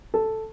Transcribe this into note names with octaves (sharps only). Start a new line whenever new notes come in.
A4